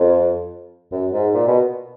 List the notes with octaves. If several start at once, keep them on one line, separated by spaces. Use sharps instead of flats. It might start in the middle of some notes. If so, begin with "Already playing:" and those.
Already playing: F2
F#2
G#2
A#2
B2